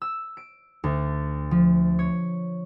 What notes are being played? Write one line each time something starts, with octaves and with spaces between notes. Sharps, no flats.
E6
D7
D2
F3
C#5